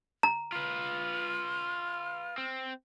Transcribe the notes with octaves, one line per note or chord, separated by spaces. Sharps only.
A#5
F4 B4 F6
C4